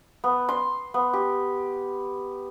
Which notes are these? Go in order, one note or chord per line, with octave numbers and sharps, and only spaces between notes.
B3
C6
B3
G4